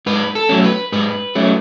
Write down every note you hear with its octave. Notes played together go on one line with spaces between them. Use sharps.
G#2 B4
A4
F#3 A3 C#4
B4
G#2 B4
F#3 A3 C#4